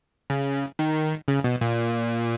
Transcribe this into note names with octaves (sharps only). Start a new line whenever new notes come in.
C#3
D#3
C#3
B2
A#2